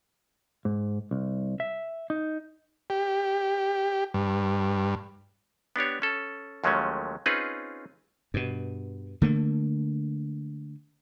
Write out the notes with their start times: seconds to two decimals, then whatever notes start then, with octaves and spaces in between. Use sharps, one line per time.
0.65 G#2
1.11 C2
1.60 E5
2.10 D#4
2.90 G4
4.14 G2
5.76 B3 D4 G4 C#5
6.02 C#4 A4
6.64 D#2 F3 F#3 G#3 A3 C#4
7.26 C4 C#4 D#4 F4 G#4 B4
8.34 G2 B2
9.22 D3 A3 A#3